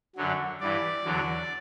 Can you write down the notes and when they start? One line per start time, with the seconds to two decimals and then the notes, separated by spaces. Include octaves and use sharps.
0.16 F#2 D3 F#3
0.60 G2 E3 D5
1.05 E2 D3 F#3